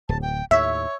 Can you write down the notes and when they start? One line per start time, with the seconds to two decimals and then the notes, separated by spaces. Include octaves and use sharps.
0.09 D1 A5
0.22 G5
0.51 D#2 A2 C#5 E5